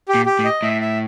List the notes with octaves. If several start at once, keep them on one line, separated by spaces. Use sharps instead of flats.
G4
A#2
G4
A2
D#5
A2 E5
E5